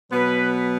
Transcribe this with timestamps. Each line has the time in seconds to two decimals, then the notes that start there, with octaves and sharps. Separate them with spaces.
0.11 B2 F#3 B3 B4